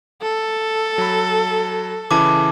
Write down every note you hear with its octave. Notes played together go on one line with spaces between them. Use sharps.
A4
F#3 B5
C#3 E3 E4 A5 D6